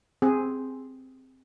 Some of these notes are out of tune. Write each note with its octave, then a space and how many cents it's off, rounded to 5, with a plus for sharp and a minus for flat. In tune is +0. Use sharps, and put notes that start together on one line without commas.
C4 +0 G#4 +0